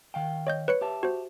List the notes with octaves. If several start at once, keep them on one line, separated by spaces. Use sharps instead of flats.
D#3 F5 G5
C#5 D#5 G6
B4 C#5 C#7
G4 E5 A5
F#4 C5